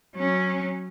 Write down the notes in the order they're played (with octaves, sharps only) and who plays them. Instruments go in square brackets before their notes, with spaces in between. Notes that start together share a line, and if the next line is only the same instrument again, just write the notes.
[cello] F#3 C#4